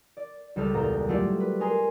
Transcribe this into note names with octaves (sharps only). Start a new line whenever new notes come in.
D5
C#2 G3 A4 F6
E2 A#2 A#5 F6 G6
F#3 A3 F4 G4 D5
B4
G#4 A#4 G#5 C6